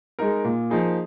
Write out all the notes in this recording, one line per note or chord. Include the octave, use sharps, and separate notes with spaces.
G#3 D#4 A#4
A#2
F3 A#3 D#4 G#4